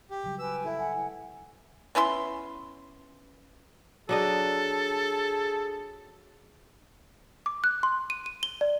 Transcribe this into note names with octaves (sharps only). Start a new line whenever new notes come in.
G4
C#3 F#3 G3
B4 G5 G#5 E6
E4 A4 E5
F#5 G#5
B3 C#4 E4 C6
F#3 D4 G#4 A4 D#5
D6
F#6
C6
D#7
D#7
G7
D5